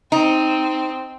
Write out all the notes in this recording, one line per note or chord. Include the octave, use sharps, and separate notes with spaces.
C4 D#4